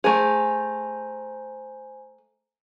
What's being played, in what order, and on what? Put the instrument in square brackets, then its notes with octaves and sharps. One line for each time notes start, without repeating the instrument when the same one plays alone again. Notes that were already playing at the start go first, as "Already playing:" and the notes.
[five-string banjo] A3 G#4 [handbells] C5 G#5 A#5